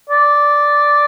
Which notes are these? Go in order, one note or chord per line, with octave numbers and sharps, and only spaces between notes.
D5